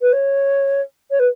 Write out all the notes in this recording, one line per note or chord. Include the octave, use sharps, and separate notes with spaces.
B4
C#5
C#5
B4